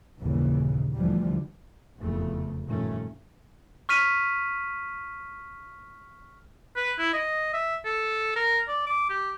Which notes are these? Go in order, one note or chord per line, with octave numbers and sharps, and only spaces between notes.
G1 D#2 A#2 C#3 E3
D2 D3 E3 F3 G3
F1 E2 A#2 C#3 A3
G2 A#2 D#3 F3 A3 C#4
C#6 F6 B6 D#7 F7
B4
E4
D#5
E5
A4
A#4
D5
D6
G4